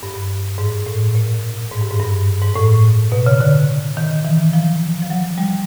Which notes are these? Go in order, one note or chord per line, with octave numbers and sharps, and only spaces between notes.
G2
G#2
A2
A#2
G#2
G2
G#2
G2
G#2
A2
B2
C#3
D3
D#3
E3
F3
F3
F#3
G3